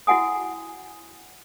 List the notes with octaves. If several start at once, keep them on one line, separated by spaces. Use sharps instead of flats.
E4 F#4 F#5 G#5 D#6